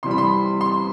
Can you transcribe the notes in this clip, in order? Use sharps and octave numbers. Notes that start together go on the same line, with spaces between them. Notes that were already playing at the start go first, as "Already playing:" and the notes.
C3 E3 G3 C6
B5
C6
C6